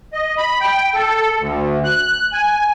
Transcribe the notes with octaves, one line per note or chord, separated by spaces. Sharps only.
D#5
B5
G5
A4
D2
F#6
G#5